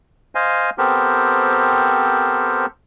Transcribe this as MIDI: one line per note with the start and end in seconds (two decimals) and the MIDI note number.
0.35 0.70 72
0.35 0.70 75
0.35 0.70 77
0.35 0.70 80
0.78 2.66 59
0.78 2.66 60
0.78 2.66 67
0.78 2.66 69
0.78 2.66 70
0.78 2.66 72